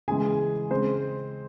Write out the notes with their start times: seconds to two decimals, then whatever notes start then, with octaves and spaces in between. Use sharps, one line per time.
0.08 C#3 E3 G#3 G#4 G#5
0.71 C#3 G#3 C4 C5